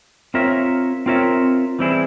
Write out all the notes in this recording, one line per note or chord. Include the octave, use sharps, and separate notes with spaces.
C4 F4 A#4 C#5 E5
C4 F4 A#4 C#5 E5
E3 G3 C4 E4 G#4